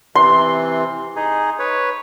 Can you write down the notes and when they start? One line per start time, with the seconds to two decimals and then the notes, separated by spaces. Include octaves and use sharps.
0.15 C3 E3 C6
1.16 D#4 G#4
1.59 B4 C#5